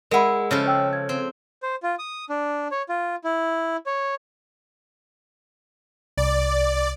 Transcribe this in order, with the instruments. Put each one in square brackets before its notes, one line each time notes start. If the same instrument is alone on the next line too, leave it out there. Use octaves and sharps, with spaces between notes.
[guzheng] G#3 E4 [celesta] A#4 F#5 B5
[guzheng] C#3 F3 A4
[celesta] C#5 G5 E6
G#6
[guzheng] C4
[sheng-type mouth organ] C5
F4
D#6
D4
C#5
F4
E4
C#5
[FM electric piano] C2 [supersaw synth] D5